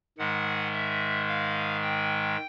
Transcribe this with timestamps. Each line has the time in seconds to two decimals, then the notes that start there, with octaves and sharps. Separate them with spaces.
0.18 G#2 D#3 G#3 F#5
0.72 E5
1.27 F5
1.82 G5